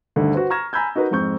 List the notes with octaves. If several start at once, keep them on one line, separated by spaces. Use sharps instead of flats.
D2 G2 D3 D#3
F#4 B4 C5
A#5 C#6 F6 G#6 A#6 E7
G#5 A#5 B5 E6 G6 G#6
D#4 F#4 A#4 B4
F2 G#2 C4 C#6 G6